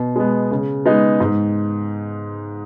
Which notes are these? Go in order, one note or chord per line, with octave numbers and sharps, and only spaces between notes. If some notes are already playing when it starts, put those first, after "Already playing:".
Already playing: B2
G#3 B3
C#3
G#3 B3 D#4
G#2